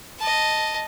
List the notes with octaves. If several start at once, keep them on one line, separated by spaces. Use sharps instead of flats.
D#5 A5